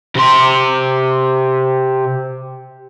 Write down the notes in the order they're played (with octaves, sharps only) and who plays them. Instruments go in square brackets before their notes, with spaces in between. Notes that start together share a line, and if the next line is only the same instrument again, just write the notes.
[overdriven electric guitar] C3 C6